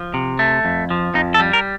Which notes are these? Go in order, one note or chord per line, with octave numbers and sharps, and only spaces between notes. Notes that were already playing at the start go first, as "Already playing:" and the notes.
Already playing: F3
C3
A3
F2
F3
F2 D#4
A4
G3
A#4